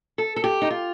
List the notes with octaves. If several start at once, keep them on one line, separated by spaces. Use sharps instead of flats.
A4
A4
G4
D#4
F4